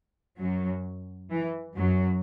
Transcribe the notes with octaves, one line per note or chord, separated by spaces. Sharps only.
F#2 F#3
E3
F#2 F#3